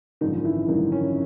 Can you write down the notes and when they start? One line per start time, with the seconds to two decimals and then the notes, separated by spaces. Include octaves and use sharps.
0.21 G#1 F#2 D3 D#3 F3 D#4
0.44 E3 E4
0.68 G#1 F#2 D3 D#3 F3 D#4
0.92 C#4